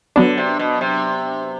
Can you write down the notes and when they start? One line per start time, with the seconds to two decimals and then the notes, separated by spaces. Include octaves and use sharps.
0.16 D3 F#3 B3 D4
0.37 C3
0.59 B2
0.81 C3